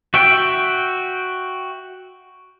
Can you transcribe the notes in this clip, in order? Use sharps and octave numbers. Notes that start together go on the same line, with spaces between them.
F#4 E5 G5